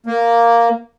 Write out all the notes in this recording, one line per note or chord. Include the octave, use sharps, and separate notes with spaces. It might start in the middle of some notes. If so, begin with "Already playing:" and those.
A#3